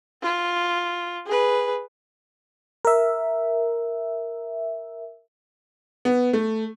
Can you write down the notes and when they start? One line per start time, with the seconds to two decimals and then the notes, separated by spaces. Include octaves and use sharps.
0.22 F4
1.27 G#4 B4
2.85 A#4 E5
6.05 B3
6.33 A3